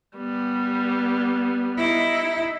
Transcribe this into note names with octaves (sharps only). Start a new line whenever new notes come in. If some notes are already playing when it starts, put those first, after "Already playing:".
G3 B3
D#4 E4